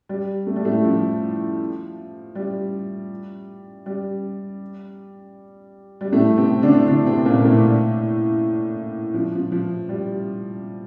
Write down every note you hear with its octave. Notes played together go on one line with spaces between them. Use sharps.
G3
A3
G3
A2 A3
F3
G3
G3
G3
A2 A3
C3 C4
D3 D4
D3 D4
C3 C4
A#2 A#3
A2 A3
F3
F3
F3
G3